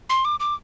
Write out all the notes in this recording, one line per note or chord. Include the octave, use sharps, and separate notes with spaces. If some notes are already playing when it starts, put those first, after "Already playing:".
C6
D6
D6